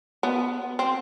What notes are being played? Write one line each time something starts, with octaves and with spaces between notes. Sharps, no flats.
B3
C4